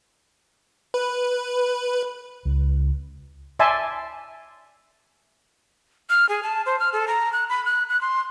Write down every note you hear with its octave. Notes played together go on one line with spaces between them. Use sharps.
B4
C#2
D5 E5 G#5 A5 C6
F6
G#4
A5
C5
F6
A4
A#5
F#6
B5
F#6
F#6
C6